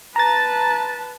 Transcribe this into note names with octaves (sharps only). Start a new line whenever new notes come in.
B4 A5 A#5 A6